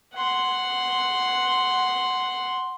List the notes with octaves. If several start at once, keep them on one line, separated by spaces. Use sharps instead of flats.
F#5 C6